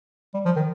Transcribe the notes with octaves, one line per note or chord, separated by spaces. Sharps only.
G3
F3
D#3